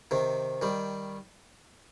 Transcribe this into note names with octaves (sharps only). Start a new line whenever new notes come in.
C3 D#3
D#3 G3